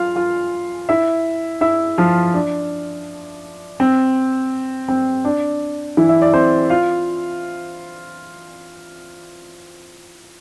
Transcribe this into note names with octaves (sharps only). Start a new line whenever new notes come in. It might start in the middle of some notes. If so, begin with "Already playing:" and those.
Already playing: F4 F5
F4 F5
E4 E5
E4 E5
F3 F4
D4
C4
C4
D4
E3 E4
E5
D5
C4 C5
F4 F5